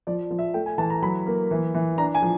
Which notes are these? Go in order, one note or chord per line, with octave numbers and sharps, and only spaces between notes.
F3 D5
F3
E5
A3 G5
G#5
E3 A5
A#5
F#3 B5
A#3
E3
E3
D4 A#5
G#5
F3